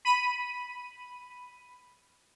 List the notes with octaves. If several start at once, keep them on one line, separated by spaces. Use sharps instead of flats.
B5 D#7